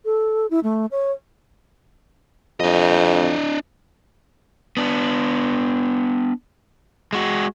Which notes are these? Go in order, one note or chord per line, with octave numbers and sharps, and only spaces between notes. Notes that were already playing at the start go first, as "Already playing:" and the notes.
A4
E4
A3
C#5
F2 D4 D#5
B3 D4
G#3 F#4